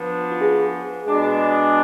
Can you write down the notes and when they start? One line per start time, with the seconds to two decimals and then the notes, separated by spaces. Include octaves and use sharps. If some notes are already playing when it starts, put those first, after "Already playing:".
Already playing: F3 B3 D4
0.31 F4
0.41 G#4
1.07 B2 G#3 D4